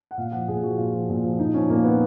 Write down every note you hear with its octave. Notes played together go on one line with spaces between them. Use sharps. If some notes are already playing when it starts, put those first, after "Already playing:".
F#5
A#2 F5
F3 F#5
A#2 G#4
F3 F#4
A#2 F4
F3 F#4
A#2
F3
A#2 D#4
F3 C#4
A#2 A#3
F3 B3